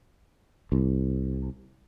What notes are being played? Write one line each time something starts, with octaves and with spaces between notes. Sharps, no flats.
C2